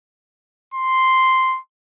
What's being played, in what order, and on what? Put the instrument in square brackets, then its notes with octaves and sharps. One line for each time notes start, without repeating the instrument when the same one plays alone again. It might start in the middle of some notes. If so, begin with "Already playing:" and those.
[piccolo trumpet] C6